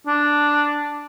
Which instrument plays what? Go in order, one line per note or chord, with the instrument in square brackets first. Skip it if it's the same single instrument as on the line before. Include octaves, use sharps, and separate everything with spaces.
[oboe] D4